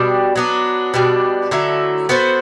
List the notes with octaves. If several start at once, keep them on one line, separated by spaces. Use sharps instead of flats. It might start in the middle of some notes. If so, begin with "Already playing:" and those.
Already playing: B2 G3 D4
F#3 B3 D4
B2 G3 D4
D3 F#3 A3 E4
B3 F#4 A4 C5